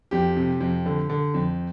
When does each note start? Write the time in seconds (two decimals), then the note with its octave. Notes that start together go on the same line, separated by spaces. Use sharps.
0.11 F2 G4
0.37 C3
0.61 F2
0.86 D3
1.10 D3
1.34 F2